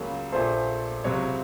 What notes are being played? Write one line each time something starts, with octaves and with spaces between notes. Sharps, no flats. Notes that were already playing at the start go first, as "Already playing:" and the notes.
Already playing: C#2 C#3 F#3 A#3
A#1 A#2 A3 C5
C#2 C3 F#3 C#5